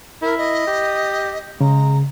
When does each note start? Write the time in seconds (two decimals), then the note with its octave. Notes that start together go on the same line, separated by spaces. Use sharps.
0.22 E4 A#4
0.37 D#5
0.67 G4
1.61 C#3 G#3 A#5